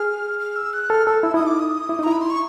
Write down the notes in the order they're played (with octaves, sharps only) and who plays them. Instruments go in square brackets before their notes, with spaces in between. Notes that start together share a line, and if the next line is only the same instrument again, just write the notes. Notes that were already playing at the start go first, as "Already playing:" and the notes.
Already playing: [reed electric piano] G#4 [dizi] F6
[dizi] F6
E6
F#6
[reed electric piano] A4 [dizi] F6
[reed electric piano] A4 [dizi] E6
[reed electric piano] E4 [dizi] E6
[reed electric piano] D#4 E4 [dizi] D#6
[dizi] D6
D#6
[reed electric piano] E4
D#4
[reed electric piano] E4 [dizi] A#5
[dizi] B5
C6
C#6